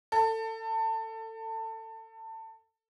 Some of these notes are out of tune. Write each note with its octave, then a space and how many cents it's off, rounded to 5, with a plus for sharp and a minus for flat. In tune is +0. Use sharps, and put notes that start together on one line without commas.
A4 +25